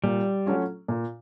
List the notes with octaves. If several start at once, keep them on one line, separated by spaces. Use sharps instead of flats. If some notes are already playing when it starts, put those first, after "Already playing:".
A#2 G3
F#3 A3 C#4 F4
A#2